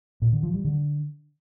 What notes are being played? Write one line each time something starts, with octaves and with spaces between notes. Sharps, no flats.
A#2
D3
F3
G3
D3